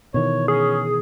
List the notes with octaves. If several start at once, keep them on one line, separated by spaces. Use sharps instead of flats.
B2 D#3 E3 C#5
C#4 G#4